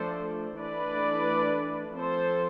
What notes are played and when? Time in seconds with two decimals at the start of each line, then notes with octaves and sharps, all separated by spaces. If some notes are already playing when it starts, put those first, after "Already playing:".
Already playing: F3 A3 D4 A4 C5
0.59 E3 A3 D4 B4 D5
1.96 F3 C4 A4 C5